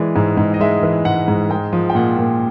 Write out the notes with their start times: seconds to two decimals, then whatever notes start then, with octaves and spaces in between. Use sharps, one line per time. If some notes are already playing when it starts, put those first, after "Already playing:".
Already playing: E3 G#3 D5
0.16 G#2
0.37 G#2
0.54 D#5
0.61 G#3 E5
0.83 E3
1.05 G#2 F#5
1.28 G#2
1.50 G#3 G5
1.73 F3
1.90 G5
1.95 A#2 F#5
2.18 A#2